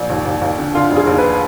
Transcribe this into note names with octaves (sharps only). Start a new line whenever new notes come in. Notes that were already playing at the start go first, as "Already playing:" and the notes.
Already playing: A#1
D#2
D#2
D#2
D3
D3 F4
F1
G#4
D#2
B4